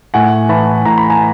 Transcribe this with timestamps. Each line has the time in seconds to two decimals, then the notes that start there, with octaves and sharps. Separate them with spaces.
0.14 A2 F#5 G#5
0.49 E3 A5 B5
0.85 A2 A#5
0.98 B5
1.10 G#5 A#5